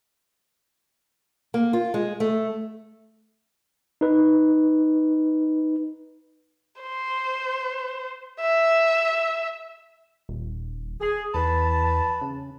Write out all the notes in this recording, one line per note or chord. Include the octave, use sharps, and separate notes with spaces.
A#3
F4
G#3
A3
D#4 B4
C5
E5
D#1
G#4
E2 B4 A5
C#3